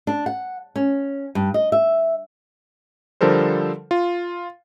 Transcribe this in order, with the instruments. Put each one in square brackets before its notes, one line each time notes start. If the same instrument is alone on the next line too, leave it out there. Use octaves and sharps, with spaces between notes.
[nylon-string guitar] D4
F#5
C#4
G2
D#5
E5
[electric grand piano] D3 F3 G3 A4 A#4 C5
F4